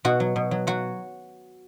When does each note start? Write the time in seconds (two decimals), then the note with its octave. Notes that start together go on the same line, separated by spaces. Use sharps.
0.05 B2 F#4
0.20 F#3
0.36 B2
0.51 F#3
0.67 F#3 F#4